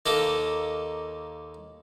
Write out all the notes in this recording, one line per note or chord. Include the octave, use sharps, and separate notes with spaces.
D#2 A#3 A4 D#5